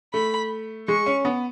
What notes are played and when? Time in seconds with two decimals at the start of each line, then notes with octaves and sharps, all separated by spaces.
0.14 A3 B5
0.88 G#3 C#6
1.06 C#4
1.25 B3